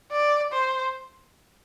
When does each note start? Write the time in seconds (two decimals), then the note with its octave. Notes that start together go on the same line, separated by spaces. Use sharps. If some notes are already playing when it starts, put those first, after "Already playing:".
0.12 D5
0.52 C5